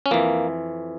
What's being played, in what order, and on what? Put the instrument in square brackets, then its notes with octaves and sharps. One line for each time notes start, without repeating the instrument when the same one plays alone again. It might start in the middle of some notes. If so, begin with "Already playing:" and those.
[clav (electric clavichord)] C#4
F2 E3 A#3